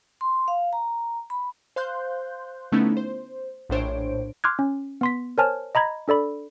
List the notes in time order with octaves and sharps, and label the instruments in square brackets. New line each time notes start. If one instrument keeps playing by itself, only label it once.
[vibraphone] C6
F5
A#5
B5
[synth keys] C5 F5 C6 F#6 G6
D3 A3 B3 C#4 D#4 E4
C5
A#1 A2 D4 C5 C#5 D7
[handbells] C6 D6 F6 F#6 G#6
C#4
B3 C6 B6
A#4 C5 C#5 G#5 A5 F6
D#5 A#5 B5 G#6
D4 A4 D5 B5